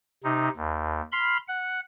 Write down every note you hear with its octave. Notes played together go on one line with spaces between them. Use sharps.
C3 D#4
D#2
B5 C6 F6
F#5